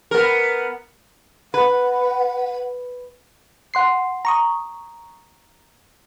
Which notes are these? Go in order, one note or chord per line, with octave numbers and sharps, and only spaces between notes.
B3 A#4
B4 F#5
F#5 C6 C7
A#5 C#6 D#6